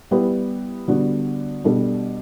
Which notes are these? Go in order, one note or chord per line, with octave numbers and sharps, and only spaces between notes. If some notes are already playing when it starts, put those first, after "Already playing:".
G3 B3 E4 G4 B4
D3 G3 B3 D4 F#4
B2 G3 D4 A4